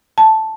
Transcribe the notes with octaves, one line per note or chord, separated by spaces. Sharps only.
A5